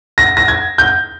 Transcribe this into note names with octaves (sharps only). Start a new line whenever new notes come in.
A#6
A#6
G#6
G6